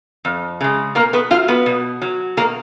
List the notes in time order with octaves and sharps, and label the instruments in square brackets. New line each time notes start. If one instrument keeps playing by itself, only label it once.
[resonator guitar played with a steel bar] F2
C#3 G#3
B2 A#3 A#4
B3 B4
F#3 F4 F5
B3 B4
B2
F#3
B2 A#3 A#4